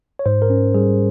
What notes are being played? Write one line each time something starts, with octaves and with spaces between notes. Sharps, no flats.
C#5
G#2 C5
A#4
C#4
G3 G#4